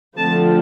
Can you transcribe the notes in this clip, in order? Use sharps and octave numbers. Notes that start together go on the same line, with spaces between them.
D3 F3 A3 C4 A5